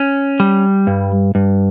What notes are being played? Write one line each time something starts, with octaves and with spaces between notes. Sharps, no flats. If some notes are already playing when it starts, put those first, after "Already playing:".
Already playing: C#4
G3
G2
G2